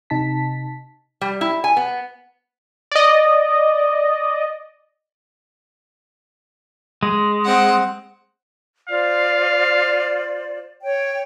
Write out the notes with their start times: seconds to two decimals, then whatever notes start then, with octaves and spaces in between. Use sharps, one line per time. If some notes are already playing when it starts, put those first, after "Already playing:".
0.10 C3 D#4 A5 B6
1.21 G3
1.41 E4
1.64 G#5
1.77 B3
2.91 D5 D#5
7.03 G#3
7.45 C4 F#5
8.89 F4 C5 D5 F5
10.83 C#5 G5